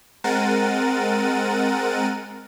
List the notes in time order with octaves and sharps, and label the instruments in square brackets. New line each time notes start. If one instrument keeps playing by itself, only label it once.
[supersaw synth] G#3 C4 A#4 F#5 A6 D#7